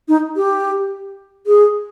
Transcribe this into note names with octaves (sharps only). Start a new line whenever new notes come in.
D#4
G4
G#4